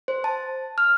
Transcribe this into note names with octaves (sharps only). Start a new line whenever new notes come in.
C5
A5
F6